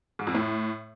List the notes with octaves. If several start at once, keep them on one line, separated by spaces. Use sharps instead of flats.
G#2
F2
A2